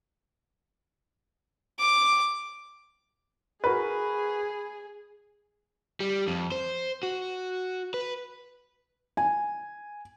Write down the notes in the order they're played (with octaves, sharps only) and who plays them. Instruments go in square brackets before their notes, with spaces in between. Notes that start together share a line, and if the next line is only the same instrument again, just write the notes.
[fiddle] D6
[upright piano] F#4 A#4 B4 [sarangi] G#4
[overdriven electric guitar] G3
F2
C5
F#4
B4
[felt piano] G#5